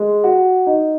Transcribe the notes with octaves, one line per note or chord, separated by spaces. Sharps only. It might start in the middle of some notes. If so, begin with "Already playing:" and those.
Already playing: G#3
F#4
D#4